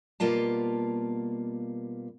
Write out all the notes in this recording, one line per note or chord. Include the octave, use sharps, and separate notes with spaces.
B2 G3 A#3 F4 F5 A5